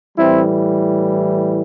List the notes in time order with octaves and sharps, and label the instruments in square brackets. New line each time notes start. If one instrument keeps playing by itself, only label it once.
[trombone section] A2 E3 G3 C4 E4